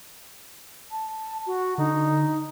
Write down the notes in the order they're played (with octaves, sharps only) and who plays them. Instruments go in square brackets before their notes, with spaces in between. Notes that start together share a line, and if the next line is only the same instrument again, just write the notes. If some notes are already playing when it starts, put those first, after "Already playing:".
[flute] A5
F#4
[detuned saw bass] D3 [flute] D#4